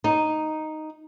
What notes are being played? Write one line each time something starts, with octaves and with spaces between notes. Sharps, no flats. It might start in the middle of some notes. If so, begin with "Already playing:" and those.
D#4